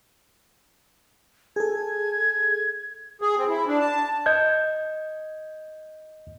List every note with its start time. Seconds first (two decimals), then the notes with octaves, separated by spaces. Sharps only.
1.56 G#4 A4 G#6
3.22 G#4
3.37 C4
3.49 E4
3.67 D4
3.80 A5
4.26 D#5 G6 G#6